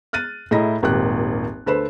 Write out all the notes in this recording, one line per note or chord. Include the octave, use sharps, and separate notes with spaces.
F6 F#6 A6 D#7
A2 E4 G#4 D#5 A#5 A#6
D#1 G#1 A#2 G4 F#6
D2 A4 B4 C5 E7